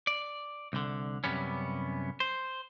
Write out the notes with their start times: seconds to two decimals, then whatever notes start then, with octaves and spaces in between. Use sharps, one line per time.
0.07 D5
0.73 C2 D3
1.24 F#2 C3 G3 B3 C#4
2.20 C5